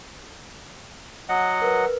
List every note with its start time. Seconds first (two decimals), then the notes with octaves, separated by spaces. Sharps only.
1.29 F#3 D#5 F#5
1.62 A#4 B4